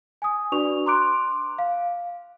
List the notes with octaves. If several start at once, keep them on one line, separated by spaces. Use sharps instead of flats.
G#5 D#6
D4 F#4 B4 D5 C#6 F7
A#5 C6 D6 F#6 D7
F5